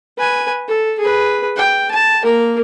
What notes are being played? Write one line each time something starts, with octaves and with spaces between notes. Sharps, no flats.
B4 G#5
A4
G#4 B4
G5
A5
A#3 A#4